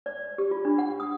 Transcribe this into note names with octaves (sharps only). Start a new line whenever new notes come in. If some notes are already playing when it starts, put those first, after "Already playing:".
D5
G4
F4
D4
F#5
D#6